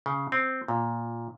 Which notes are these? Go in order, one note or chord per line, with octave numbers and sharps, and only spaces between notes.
C#3
C4
A#2